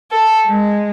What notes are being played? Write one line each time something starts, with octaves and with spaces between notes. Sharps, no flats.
A4
G#3